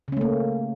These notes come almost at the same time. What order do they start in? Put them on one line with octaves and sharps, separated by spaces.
C#3 C#4 A3 A#3